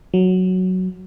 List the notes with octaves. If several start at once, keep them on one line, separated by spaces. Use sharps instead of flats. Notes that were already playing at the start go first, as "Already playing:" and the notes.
F#3